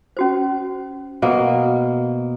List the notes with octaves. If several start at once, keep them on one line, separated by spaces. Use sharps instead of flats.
C#4 F#4 C5
B2 A#3 C5